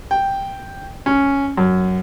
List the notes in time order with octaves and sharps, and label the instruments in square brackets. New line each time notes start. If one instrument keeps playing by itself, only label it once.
[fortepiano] G5
C#4
F#2